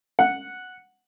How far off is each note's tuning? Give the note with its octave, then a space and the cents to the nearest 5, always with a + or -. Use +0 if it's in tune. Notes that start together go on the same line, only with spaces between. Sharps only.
F#5 -5